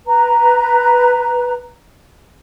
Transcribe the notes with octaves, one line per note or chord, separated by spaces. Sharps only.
B4 A#5